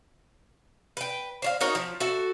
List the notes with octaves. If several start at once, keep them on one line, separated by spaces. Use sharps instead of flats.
B4 G5
C5 C#5 F5
D#4 F#4 A#4 C#5
F3
F#4 A4 E5